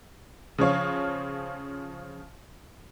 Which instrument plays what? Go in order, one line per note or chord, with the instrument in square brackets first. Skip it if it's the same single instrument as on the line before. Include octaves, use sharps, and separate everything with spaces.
[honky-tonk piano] C#3 F3 C#5 F5